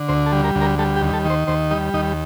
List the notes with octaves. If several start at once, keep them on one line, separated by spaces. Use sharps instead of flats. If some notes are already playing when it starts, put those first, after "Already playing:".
Already playing: D3
D2 C5
A4
G3
A#4
D2
A#4
G3 A4
G4
D#2
A4
D#3 C5
D#2 C5
G3 D#4
D#2 D#4